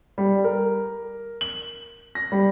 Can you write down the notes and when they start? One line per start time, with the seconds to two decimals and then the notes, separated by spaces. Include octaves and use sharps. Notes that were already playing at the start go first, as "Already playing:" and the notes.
0.18 G3
0.44 A#4
1.41 F#7
2.15 A#6
2.32 G3